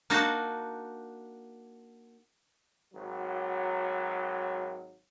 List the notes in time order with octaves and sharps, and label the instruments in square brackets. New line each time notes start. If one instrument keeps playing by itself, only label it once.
[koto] A#3 D4 D#4 F#4
[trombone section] G#1 F#3